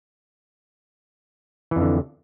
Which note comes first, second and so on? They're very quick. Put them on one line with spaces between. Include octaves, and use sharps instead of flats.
E3 F2 D3